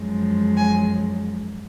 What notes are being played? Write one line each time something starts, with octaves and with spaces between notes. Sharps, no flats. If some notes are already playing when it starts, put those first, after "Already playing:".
Already playing: F#2 F3 G#3
G#5